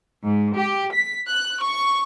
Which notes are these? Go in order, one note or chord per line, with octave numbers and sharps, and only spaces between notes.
G#2
G4
B6
F#6
C#6